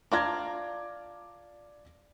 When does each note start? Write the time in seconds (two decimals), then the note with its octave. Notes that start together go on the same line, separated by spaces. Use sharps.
0.12 D4 F4 D5 A#5 D6 G#6